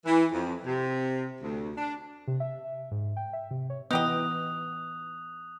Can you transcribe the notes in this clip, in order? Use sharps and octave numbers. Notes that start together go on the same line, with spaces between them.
E3
F2
C3
D2
D4
C3
E5
G#2
G5
E5
C3
C#5
E3 B3 D#4 G4 D#5 D#6 F#6 F7